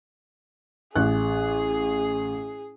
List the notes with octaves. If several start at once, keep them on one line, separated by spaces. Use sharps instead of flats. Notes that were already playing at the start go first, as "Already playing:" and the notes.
A1 G#4 F#6